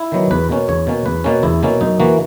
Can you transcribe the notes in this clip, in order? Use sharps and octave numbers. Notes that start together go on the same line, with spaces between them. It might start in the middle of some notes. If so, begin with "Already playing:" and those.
Already playing: E4
D#3 F#3 B3
E2 B4
B2 A#3 C#4
E2 C#5
B2 A#3 C#4
E2 B4
B2 A#3 C#4
E2 E4
B2 A#3 C#4
F#2 D#4
E3 A#3 F#4